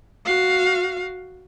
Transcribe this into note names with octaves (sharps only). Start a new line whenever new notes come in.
F#4 F5